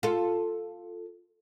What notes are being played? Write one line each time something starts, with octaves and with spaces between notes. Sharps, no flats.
F4 A4